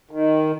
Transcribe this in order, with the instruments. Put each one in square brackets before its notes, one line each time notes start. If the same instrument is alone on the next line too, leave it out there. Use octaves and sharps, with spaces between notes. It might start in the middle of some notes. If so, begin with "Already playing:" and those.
[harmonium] D#3